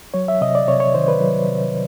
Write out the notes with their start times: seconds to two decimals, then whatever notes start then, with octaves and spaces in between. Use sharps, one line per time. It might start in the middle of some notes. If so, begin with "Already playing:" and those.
0.14 F#3 C#5
0.28 E5
0.41 C3 D#5
0.55 D5
0.68 C3 C#5
0.80 C#5
0.94 D#3 C5
1.08 B4
1.21 F#3
1.47 C3